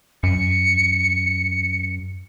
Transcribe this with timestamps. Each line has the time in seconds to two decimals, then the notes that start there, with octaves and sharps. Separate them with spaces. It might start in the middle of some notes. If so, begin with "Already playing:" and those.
0.23 F#2 C#7